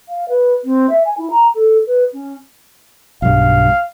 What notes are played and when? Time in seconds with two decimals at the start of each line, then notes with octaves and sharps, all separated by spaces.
0.08 F5
0.28 B4
0.64 C4
0.89 E5
1.04 G#5
1.17 E4
1.30 A#5
1.54 A4
1.86 B4
2.13 C#4
3.22 B1 G2 F5